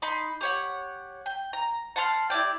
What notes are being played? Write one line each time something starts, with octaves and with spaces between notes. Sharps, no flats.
D#4 B5 C6
G4 C#5 F#5
G5
A#5
F#5 A5 C6 F6
E4 G4 D5 G5